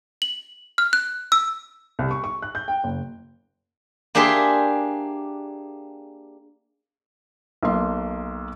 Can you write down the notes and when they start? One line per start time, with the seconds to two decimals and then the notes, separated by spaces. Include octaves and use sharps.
0.22 F#7
0.78 F6
0.93 F#6
1.32 E6
1.99 C2
2.11 C#6
2.24 C#6
2.42 F#6
2.55 G6
2.68 G5
2.84 F#1
4.15 A#3 D4 G4 G#4 E5 C6
7.63 B1 A#3 C6